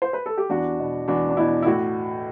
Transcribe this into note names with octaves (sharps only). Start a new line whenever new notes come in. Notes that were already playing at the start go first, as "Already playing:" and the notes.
C5
B4
A4
G4
E2 D4 F#4
B2
E2 D4 F#4
D4
B2 E4
E4
A2 F#4